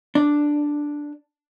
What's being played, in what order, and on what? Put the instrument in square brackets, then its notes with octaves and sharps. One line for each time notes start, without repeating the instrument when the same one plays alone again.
[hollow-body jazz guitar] D4